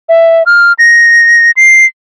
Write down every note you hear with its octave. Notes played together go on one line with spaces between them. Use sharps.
E5
F6
A#6
C7